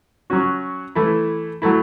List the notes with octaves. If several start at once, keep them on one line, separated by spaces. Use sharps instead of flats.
F#3 C#4 F#4
E3 A3 E4
F#3 A3 E4